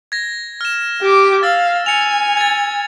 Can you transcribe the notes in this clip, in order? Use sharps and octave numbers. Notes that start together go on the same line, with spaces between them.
G#6 A#6
F6 E7
G4 D6
F5 E6 A6
G#5 C#7 F7
G#6 A6